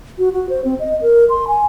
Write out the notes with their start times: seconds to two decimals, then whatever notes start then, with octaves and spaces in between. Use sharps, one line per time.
0.18 F#4
0.33 F#4
0.49 C5
0.64 C4
0.79 D#5
1.01 A#4
1.29 C6
1.48 G#5